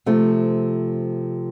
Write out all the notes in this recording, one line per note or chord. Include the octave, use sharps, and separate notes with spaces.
C3 F3 A3